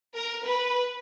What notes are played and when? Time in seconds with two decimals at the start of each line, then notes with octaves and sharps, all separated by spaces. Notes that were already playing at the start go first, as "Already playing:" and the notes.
0.15 A#4
0.44 B4